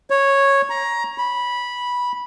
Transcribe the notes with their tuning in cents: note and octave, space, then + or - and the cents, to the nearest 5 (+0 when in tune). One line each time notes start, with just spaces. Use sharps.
C#5 -10
A#5 +15
B5 -10